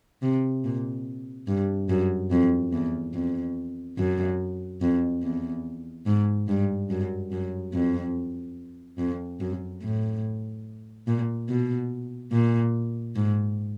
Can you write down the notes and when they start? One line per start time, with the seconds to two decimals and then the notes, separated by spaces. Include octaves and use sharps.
0.22 C3
0.65 A#2
1.48 G2
1.89 F#2
2.31 F2
2.73 E2
3.14 F2
3.98 F#2
4.81 F2
5.23 E2
6.07 G#2
6.48 G2
6.90 F#2
7.32 F#2
7.74 F2
8.99 F2
9.40 F#2
9.82 A2
11.07 A#2
11.49 B2
12.33 A#2
13.16 G#2